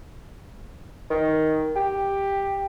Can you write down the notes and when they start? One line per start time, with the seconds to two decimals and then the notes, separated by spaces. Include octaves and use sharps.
1.10 D#3
1.76 G4